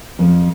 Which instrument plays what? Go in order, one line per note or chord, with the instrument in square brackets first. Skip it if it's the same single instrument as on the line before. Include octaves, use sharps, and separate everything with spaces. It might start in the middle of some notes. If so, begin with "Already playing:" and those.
[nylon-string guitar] F2